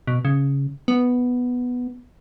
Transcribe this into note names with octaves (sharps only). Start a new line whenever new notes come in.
B2
C#3
B3